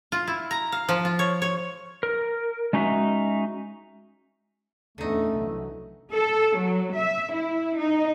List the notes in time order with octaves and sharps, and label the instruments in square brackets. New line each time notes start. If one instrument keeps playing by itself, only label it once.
[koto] F4
E4
A#5
F5
F3
F4
C#5
C#5
[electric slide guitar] A#4
G#3 C#4 D#4 F#4 E5
[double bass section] E2 A#2 C#4 [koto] D3 D#4 [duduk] A3
[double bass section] C2 E3 F#3
[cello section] A4
F#3
E5
E4
D#4